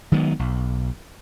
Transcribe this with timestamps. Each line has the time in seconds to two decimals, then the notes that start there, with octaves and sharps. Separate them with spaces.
0.12 D#3 F#3 G#3 B3
0.39 B1